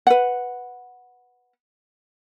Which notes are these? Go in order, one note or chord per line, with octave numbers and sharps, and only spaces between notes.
B4 F#5